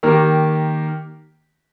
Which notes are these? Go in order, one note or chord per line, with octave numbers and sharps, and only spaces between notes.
D#3 A#3 G4 A#4